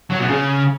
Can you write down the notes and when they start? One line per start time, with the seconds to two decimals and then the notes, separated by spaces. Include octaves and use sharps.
0.10 F#3
0.19 B2
0.28 C#3